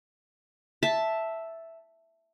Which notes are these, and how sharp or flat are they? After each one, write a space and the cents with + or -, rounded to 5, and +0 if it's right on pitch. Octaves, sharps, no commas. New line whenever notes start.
E5 +0 A5 +0